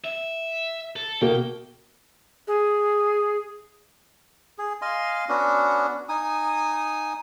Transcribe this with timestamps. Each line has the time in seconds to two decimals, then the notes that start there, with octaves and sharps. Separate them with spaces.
0.05 E5
0.96 A4
1.21 B2 A#3 G5
2.48 G#4
4.58 G#4
4.82 D#5 F5 G#5 C6
5.29 B3 C#4 D4 F#4
6.09 D#4 G#5 D#6